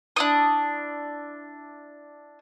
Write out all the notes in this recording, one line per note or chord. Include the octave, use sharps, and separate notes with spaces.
D4 E4 D#6